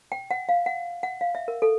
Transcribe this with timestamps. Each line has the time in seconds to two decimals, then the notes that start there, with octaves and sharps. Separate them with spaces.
0.12 G5
0.31 F#5
0.49 F5
0.66 F#5
1.03 F#5
1.21 F5
1.35 E5
1.48 A#4
1.62 A4